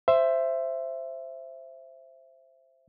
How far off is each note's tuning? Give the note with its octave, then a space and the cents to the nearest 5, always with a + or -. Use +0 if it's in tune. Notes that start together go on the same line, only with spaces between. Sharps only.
C5 +0 E5 +15